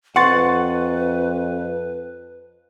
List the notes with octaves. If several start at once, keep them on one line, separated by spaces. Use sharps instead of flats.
F2 B4 F#5 C6 C#6 A6